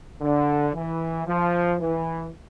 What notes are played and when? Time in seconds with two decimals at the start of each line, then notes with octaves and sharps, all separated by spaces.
0.21 D3
0.74 E3
1.27 F3
1.80 E3